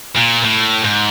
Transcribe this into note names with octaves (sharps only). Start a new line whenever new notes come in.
A#2
A2
G#2